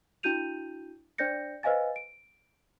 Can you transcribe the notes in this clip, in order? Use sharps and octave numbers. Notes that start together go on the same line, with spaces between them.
D4 E4 F#4 G6 D#7 F7
D4 C5 D5 G6 A#6 C#7
B4 C5 D#5 F5 G#5 A6
D7